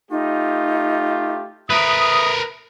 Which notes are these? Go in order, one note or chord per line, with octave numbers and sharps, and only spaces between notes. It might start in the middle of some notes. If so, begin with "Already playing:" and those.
A3 D#4 F4 G4
A#4 B4 E5 D#6